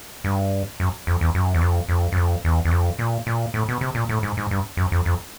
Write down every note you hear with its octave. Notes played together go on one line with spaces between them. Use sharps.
G2
F#2
F2
E2
F#2
E2
F2
F2
F#2
F2
E2
E2
F2
A#2
A#2
A2
B2
C3
A#2
A2
G#2
G#2
G2
F#2
F2
F2